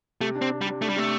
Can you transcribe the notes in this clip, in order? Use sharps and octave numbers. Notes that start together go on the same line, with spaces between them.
C3 A3
D4
C4
C3
G3
C3
A3 D4
G3
C3 A3